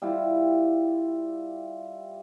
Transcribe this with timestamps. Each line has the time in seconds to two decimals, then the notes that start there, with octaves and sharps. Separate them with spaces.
0.02 G3 E4 F4 G4